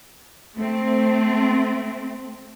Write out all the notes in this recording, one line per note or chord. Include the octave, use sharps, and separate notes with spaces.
A3 C4